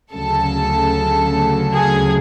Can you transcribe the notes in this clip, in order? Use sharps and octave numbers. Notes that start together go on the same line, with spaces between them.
D2 C#3 F#3 A4
G#4